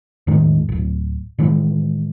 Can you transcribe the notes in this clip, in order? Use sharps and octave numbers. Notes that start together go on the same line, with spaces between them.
E2 A2 D#3 G#3
D1 G1
A2 D#3 E3 G#3